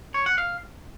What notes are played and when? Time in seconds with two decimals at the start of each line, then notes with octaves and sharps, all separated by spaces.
0.14 C#5
0.26 F#5
0.38 F5